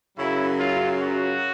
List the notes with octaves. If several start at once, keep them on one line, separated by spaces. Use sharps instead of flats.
F#2 C#3 F#3 E4
F4
F#4